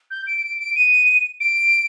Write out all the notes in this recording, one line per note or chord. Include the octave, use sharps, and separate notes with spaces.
G6
D7
D7
D7
D#7
D7